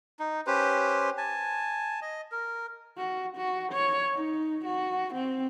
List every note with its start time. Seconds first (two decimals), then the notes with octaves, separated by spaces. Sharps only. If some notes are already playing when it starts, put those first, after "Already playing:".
0.19 D#4
0.47 C#4 G4 B4 C5
1.18 G#5 A5
2.02 D#5
2.32 A#4
2.97 F#4
3.37 F#4
3.73 C#5
4.15 D#4
4.65 F#4
5.15 C4